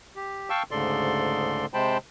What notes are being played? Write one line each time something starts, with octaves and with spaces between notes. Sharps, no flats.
G4
F5 G5 A5 C#6 E6
D2 G#2 C#3 A4 D5 C6
C3 G#3 C5 G5 A5 B5